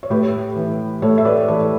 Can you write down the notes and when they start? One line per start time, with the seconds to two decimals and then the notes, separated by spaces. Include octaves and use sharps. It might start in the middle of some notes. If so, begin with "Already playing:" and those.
0.03 C#5
0.10 A2 G4 B4
0.56 E3
1.02 A2 A4 C#5
1.18 E5
1.25 B4 D5
1.48 E3 A4 C#5